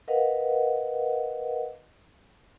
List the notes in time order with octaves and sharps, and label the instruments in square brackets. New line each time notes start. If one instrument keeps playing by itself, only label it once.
[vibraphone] A#4 B4 D#5 F5 F#5